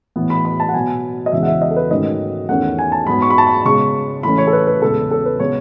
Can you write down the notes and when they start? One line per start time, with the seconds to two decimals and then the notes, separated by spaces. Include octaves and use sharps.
0.16 A2 E3 B3
0.30 B5
0.45 B5
0.60 A5
0.69 F#5
0.74 B2 F#3 B3 G#5
1.26 D#5
1.32 E2 C#3 E3 G#3 E5
1.43 F#5
1.47 E5
1.62 D#5
1.71 A4
1.76 B4
1.91 G#2 D#3 F#3 A3 C#4 D#5
2.49 E2 D#3 A3 C#4 F#5
2.79 G#5
2.92 A5
3.07 G#2 F#3 B3 B5
3.22 C#6
3.30 B5
3.38 A5
3.47 B5
3.65 C#3 G#3 B3 C#6
4.23 A2 E3 A3 C#4 B5
4.38 C#5
4.47 A4
4.53 B4
4.67 B4
4.82 E2 C#3 G#3 A4
5.11 A4
5.26 B4
5.40 C#3 G#3 B3 C#5